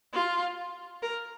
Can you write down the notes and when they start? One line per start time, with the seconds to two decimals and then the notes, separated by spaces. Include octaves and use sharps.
0.13 F4
1.02 A#4